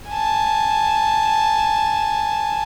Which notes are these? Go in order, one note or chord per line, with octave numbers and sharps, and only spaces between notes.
G#5 A5